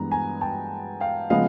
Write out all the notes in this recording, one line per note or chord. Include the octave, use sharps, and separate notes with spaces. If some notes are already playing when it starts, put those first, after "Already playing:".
Already playing: G2 E3 G#3 B3 A#5
G#5 A#5
G5 A5
F5 G5
C#3 F3 G#3 B3 D#5 F5